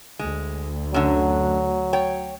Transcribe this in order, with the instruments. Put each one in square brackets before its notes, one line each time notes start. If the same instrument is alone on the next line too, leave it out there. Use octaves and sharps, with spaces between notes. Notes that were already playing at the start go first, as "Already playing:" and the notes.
[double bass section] D2 [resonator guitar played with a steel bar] G#3
[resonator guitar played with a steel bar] F#2 D3 [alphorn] F#3
[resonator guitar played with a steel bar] C#5 G5